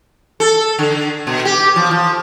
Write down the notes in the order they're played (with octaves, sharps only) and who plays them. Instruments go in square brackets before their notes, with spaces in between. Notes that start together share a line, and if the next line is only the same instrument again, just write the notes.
[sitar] A4
D3
B2
G4
F3
F3